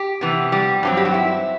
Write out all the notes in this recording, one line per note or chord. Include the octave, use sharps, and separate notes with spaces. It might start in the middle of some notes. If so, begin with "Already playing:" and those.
Already playing: G4
C3 E3 B3
G3 G4
G2 F#3 C4
G4
F#4
E4